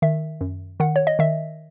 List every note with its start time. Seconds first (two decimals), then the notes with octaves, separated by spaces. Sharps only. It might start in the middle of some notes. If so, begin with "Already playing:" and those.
0.02 D#3 E5
0.41 F#2
0.80 D#3 F#5
0.96 C#5
1.07 D#5
1.19 D#3 E5